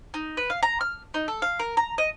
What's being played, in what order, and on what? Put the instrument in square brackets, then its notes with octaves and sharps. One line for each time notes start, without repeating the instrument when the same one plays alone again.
[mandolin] D#4
B4
F5
A#5
F6
D#4
A4
F5
A#4
A#5
D#5